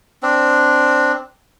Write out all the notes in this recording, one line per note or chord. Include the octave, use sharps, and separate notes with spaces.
C4 D4